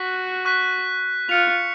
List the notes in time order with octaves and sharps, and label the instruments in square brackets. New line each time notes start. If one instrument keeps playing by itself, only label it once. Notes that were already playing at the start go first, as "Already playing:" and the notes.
Already playing: [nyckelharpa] F#4 [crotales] C#6 F#6 B6
[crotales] C#6 F#6 B6
[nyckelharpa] F4 [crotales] F#6 C#7 F7